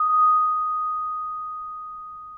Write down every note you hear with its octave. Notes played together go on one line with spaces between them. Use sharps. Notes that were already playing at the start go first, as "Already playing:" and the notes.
Already playing: D#6